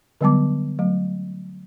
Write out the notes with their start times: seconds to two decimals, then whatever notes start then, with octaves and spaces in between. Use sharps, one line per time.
0.21 D3 F#3 G3 B3 A5 D6
0.79 F#3 A3